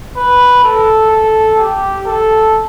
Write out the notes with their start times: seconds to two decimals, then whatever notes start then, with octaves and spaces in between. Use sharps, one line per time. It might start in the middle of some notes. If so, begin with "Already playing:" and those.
0.17 B4
0.64 A4
1.11 A4
1.58 G4
2.06 A4